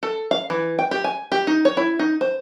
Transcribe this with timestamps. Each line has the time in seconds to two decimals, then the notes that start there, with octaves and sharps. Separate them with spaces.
0.03 A4
0.31 F5
0.50 E3
0.79 G5
0.91 G4
1.04 G#5
1.32 G4
1.47 D#4
1.65 C#5
1.77 E4
1.99 D#4
2.21 C5